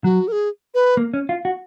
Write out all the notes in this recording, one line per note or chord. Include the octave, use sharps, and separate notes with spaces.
F#3 F#4
A#4
G#4
B4
A#3
C#4
F4
F#4